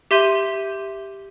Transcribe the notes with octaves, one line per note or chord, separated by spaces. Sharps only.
G4 E5 C6 G6 D#7